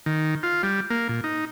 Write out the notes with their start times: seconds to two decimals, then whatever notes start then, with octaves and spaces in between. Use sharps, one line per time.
0.06 D#3
0.43 F4
0.63 G3
0.90 A#3
1.09 A#2
1.24 D#4